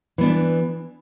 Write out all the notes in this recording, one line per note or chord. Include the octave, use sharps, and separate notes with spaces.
E3 B3 D4